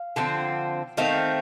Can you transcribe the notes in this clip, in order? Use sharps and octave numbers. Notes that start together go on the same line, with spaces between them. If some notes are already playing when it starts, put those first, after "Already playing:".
Already playing: F5
D3 F3 C4
D#3 A3 C4 F5